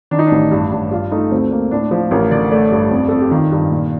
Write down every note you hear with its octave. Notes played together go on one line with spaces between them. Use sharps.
D#3 D4
D#4
A1 D4
G2
G2
G2 F4
A3 D#4
D2 C4
A#3
A2 D4
F3 C5
A1 A#4
D3 D5
A3 D5
G2
F2
F2 A4
G4
D#3 F4
G2
A#2